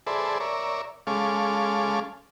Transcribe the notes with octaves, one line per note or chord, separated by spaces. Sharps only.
G#4 A4 B4 C5 D5 E5
A#4 C#5 D5 E5
G#3 C#4 A4 F5 D6